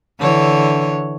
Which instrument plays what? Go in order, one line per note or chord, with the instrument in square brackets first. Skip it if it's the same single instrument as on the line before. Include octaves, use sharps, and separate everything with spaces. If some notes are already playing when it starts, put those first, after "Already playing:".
[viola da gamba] D3 E3 C#5